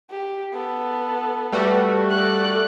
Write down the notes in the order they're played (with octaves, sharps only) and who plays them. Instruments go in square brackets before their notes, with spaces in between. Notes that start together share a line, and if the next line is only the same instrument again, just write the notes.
[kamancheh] G4
B3 A4
[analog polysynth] G3 A3 F#4 [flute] B4
[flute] A4 [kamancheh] D5 F#6